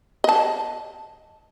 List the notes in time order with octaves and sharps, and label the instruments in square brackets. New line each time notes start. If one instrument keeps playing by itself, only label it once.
[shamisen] D#5 A5